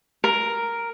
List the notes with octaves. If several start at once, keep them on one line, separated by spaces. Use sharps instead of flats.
A#4